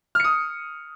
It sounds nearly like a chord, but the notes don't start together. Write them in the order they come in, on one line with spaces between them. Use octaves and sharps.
F6 C#7 D#6